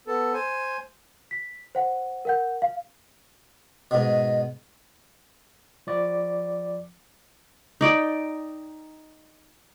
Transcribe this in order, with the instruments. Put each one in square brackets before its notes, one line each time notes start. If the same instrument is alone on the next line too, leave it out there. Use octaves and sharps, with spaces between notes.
[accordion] B3 A4
C5 G#5
[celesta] B6
C5 F#5
A#4 F#5 G6
F5
[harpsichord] G#2 B2 [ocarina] D#5
[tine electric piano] F3 D5
[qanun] D#4 D5 G5